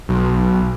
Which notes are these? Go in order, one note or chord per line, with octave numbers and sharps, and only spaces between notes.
B1